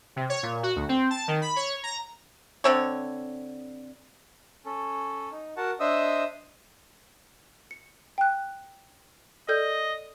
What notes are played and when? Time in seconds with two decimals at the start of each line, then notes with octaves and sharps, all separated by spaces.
0.16 C3
0.29 C#5
0.43 A#2
0.63 F#4
0.76 D2
0.89 C4
1.10 A5
1.28 D#3
1.42 B5
1.56 C#5
1.83 A#5
2.64 D3 C4 C#5
4.66 C#4 A4
5.31 D#4
5.57 F#4 A#4 F#5 A5
5.80 D4 C5 D#5 E5 D#6 E6
7.71 C#7
8.18 G5 F#6
9.49 A4 D5 D#5 G6